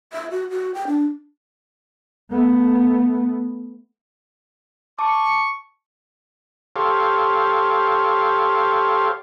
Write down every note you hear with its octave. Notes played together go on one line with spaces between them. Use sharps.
E5
F#4
F#4
G5
D4
A3 B3
A5 C#6 D6
G4 A4 C5 C#5 F5